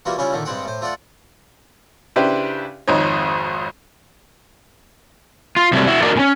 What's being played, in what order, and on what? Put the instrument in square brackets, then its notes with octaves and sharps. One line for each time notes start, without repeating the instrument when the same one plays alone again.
[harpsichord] E3 G3 A#3 F4 F#4
C#3 G3 C#4 E4 F4 G#4
A#2 D3 D#3 A3
G2 G3 G#3 C4 F#5 G5
A2 C5
A3 F4 D5 F#5
[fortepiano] C#3 D4 E4 G4 B4 C5
G#1 F2 D#4 C#5
[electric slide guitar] F4
C3 F#3 G3 A3
E4 F#4
D4 D#4 F#4 A#4 D5
A2 C#4